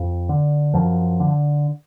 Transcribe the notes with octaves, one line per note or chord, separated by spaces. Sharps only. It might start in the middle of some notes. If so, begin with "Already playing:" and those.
Already playing: F2
D3
F#2 F3
D3